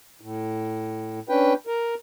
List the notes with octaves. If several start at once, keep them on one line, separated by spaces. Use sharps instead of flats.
A2
C#4 D4 B4 G5
A#4